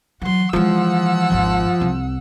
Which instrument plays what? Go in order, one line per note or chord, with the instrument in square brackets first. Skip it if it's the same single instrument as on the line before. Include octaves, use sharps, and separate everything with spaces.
[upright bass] E3 F#3 [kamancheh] F#5 C6
[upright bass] E3 G#3 [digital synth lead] F3 [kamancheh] F#5 E6
[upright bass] G#1 D#2
C2 C4